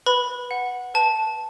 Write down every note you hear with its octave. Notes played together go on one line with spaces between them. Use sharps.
B4 B5
F#5
B4 A5